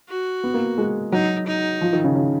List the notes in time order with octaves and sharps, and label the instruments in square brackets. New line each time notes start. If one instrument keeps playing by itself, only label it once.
[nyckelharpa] F#4
[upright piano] B3
A#3
G#3
[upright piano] F#3 [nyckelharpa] D#4
[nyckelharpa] D#4
[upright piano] F3
D#3
C#3
C#3